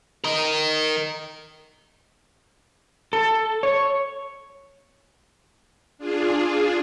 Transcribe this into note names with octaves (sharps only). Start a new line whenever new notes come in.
A#4 D#5
A4
C#5
D4 F4 G#4